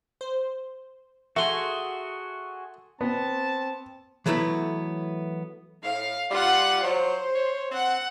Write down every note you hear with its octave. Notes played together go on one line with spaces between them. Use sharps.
C5
A3 F#4 G#4 E5 C6
B3 C4 A5
E3 F#3 A3 B3 E4
A2 F5
G3 F4 F#5
F#3 C5
C#5
C4 F#5